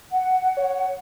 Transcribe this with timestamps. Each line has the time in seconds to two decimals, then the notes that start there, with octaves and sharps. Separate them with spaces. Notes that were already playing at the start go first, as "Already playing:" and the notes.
0.11 F#5
0.57 C#5